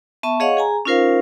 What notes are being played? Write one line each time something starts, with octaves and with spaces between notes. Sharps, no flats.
B3 E5 A5 C#6
G#4 C#5 D#5 F5 F#5 C#6
G#4 G#5 A#5
C#4 D#4 F4 A#4 C5 F5